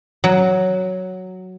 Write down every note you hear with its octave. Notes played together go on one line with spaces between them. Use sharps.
F#3